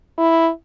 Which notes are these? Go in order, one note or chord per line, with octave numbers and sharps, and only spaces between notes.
E4